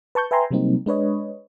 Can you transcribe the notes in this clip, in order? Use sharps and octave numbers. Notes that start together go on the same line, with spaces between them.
B4 A5 C#6 G6
B4 E5 G5 G#5 A#5 C6
C3 F#3 G3 A#3 C4 D#4
G#3 D4 B4 C#5 D#5